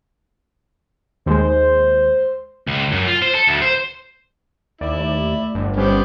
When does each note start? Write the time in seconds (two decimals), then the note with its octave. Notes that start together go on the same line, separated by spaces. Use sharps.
1.26 D#2 G#3 C5
2.68 C#2
2.92 F#2
3.07 F4
3.22 C5
3.35 A4
3.47 D2
3.61 C5
4.81 D#2 E4 D5
4.99 A3 D5
5.55 G1
5.77 G3 B3 C#4 G4 C5